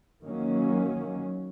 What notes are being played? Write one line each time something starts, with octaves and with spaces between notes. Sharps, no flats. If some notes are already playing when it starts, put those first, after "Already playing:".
D#3 F#3 A#3 C#4